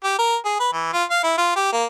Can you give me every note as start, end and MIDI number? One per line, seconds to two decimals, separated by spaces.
0.04 0.16 67
0.18 0.36 70
0.45 0.56 68
0.60 0.69 71
0.73 0.93 52
0.93 1.04 65
1.10 1.20 77
1.23 1.37 64
1.38 1.52 65
1.56 1.71 67
1.73 1.85 58